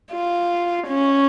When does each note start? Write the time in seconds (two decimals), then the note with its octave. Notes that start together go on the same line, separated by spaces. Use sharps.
0.12 F4
0.88 C#4